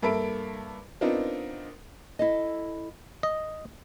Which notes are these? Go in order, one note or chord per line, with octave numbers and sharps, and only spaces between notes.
G2 A#3 A4 E5 B5 D7
B3 C4 D4 D#4 F4 A#4
E4 A4 D#5
D#5